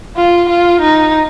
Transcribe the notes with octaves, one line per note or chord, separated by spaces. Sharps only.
F4
F4
D#4